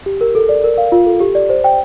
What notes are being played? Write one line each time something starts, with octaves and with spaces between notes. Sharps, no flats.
G4
A#4
A4
D5
A#4
F5
F4
A4
G4
D5
C5
G5